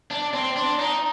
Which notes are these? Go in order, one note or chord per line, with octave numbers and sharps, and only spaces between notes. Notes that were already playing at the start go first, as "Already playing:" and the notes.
D4
C4
D4
D#4